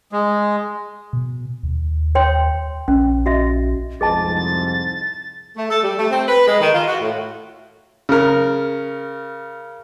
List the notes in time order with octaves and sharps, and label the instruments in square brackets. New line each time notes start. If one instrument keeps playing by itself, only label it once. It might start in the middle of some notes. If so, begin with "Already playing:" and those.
[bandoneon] G#3
[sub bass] B2
D#2
[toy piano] C#5 G5 C6
[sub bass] A#1 [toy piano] C#4
[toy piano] F#4 D#5 E5
[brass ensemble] C2 F2 G#2 [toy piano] G#4 D#5 A5 [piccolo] A6
[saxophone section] A3
A4
G3
A3
C4
B4
G#3
D#3
F4
F#4
A2
[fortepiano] C#3 A#4